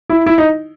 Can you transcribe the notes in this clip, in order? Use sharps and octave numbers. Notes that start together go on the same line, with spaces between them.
E4
E4
D#4